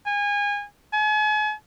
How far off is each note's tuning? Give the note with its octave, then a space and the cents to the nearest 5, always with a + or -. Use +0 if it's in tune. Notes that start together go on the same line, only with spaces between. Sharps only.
G#5 -25
G#5 +40